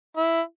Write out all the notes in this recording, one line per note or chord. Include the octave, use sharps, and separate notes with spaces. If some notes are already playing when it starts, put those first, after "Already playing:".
E4